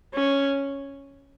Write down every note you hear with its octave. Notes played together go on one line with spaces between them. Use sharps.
C#4